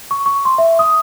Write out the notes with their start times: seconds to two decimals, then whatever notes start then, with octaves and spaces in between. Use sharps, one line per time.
0.11 C#6
0.26 C#6
0.45 C6
0.58 E5
0.79 D#6